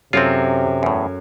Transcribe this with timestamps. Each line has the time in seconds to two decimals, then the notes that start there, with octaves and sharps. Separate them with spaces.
0.13 F#2 C3 C4 E4 F4 A4
0.83 E2 A2